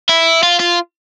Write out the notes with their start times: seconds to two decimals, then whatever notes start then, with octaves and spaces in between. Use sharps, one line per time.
0.09 E4
0.43 F4
0.60 F4